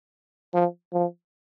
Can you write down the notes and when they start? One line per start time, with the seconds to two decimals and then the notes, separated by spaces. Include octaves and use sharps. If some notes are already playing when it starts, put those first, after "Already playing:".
0.54 F3
0.93 F3